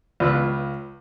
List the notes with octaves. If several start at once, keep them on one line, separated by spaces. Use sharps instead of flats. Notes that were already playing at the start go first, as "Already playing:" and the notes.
C#2 F4 B4 E6